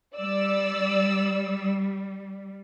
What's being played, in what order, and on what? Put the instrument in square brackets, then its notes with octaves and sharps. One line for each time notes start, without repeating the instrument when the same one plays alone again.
[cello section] G3 [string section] D5 E6